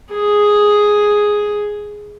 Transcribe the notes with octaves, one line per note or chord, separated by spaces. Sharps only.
G#4